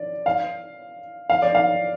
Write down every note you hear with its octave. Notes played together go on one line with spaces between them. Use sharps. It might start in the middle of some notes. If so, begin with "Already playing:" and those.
Already playing: D5
F5
F5
D5
F5